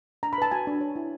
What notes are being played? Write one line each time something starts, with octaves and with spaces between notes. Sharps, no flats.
D4 A#5
B5
B4 A5
F#4 G#5
D4
C#5
E4